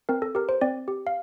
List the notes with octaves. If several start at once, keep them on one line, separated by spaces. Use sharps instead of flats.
C4 A#4
A4
G4 A#4
C5
C4 D5
G4
F5